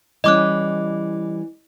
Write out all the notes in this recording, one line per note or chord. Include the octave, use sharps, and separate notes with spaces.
E3 G3 C#4 D#5 D6 F#6